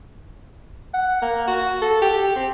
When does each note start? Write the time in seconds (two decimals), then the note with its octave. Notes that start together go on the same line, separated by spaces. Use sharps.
0.94 F#5
1.22 A#3
1.48 F#4
1.82 A4
2.02 G4
2.36 C4